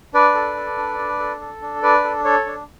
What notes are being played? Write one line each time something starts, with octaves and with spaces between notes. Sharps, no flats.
D4 B4 D5
A4
A4
D4
D4
A4
A4
D4
D4 B4 D5
A4
A4 C#5
D4